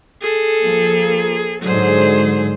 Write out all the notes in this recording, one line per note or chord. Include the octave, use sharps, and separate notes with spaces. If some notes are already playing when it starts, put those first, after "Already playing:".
G#4 A4
F3 A#3
G#2 D3 F#3 G#4 C5